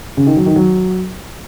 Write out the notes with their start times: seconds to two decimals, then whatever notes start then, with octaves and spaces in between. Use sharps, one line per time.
0.17 C#3
0.27 D#3
0.36 F#3
0.46 D#3
0.56 F#3